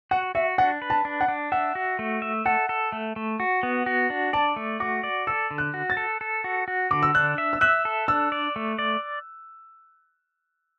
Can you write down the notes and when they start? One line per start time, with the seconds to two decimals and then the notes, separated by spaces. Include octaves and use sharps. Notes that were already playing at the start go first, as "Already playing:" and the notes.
0.11 F#4 F#5
0.35 F#4 E5
0.58 D4 F#5
0.82 B4
0.90 A5
1.05 D4
1.21 F#5
1.28 D4
1.52 E5 F#5
1.75 F#4
1.99 A3
2.22 E5
2.46 A4 F#5
2.69 A4
2.92 A3
3.16 A3
3.40 F#4
3.63 B3
3.86 F#4
4.10 D4
4.33 D5 A5
4.56 A3
4.80 F#4 D6
5.04 D5
5.27 A4 E6
5.51 D3
5.58 F#6
5.74 F#4
5.90 A6
5.97 A4
6.21 A4
6.44 F#4
6.68 F#4
6.91 D3 D6
7.03 E6
7.15 D4 F#6
7.38 E5
7.53 E6
7.61 E5 F#6
7.85 A4
8.08 D4 E6
8.32 D5
8.56 A3
8.79 D5